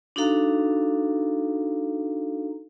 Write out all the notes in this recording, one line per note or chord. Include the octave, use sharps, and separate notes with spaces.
D4 D#4 F#4 A4 F5 A#5